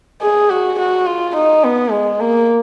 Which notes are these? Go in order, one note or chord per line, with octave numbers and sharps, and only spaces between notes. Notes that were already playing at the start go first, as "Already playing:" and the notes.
G#4
F#4
F#4
F4
D#4
B3
G#3
A#3